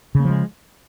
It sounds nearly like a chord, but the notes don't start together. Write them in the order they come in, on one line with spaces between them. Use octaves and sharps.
C#3 A#3 F3 G#3